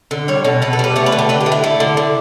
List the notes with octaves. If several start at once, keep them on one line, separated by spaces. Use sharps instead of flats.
D3
G3 C#5
B2 A4
B2 B4
A4
G3 B4
A3 C#5
B4
D3
G4
D3 B4
G4
A3
E4
A3
D3
D3